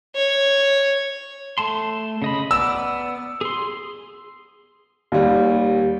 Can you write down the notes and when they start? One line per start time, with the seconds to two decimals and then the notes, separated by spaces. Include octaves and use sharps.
0.15 C#5
1.58 A3 A5 C6
2.22 C#3 D#5 B5
2.51 B3 D5 E6
3.41 G#4 C6
5.12 D#2 G3